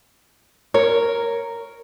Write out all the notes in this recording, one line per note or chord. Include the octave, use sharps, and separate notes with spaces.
A#4 C#5